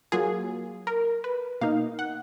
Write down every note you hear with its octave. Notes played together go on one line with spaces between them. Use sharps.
F#3 A#3 F4 G#4
A#4
B4
B2 A#3 D#4 F5
F#5